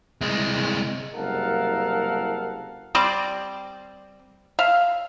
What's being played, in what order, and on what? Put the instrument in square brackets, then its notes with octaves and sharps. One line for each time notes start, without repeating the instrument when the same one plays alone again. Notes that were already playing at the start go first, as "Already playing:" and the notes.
[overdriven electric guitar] C2 G#3
[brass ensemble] F#1 C2 A4 A#4 F5 F#5
[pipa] G3 C4 C5 D5
E5 F5